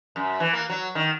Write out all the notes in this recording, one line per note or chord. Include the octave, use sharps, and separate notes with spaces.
F#2
E3
A#3
F#3
D#3